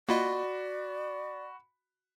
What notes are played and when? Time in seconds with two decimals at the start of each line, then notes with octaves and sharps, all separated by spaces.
0.09 A#3 F4 F#4 D5 D#5 B5